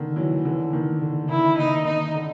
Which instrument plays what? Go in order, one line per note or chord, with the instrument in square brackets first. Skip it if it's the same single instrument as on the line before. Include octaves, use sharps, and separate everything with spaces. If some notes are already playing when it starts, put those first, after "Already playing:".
Already playing: [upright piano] D3 D#3
E3 F#3
D3 E3
D#3
D3
[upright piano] D#3 [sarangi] E4
[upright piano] D#3 [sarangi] D#4
[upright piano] D#3 [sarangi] D#4
[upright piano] D3